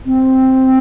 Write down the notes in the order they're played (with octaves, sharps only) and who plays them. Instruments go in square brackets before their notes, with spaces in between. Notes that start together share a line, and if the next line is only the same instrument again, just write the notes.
[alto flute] C4